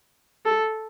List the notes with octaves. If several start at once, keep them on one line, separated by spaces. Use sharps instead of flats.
A4